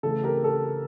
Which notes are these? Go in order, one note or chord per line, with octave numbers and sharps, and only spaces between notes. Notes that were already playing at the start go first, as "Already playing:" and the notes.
C#3 E3 A3 A4
G4 A#4
A4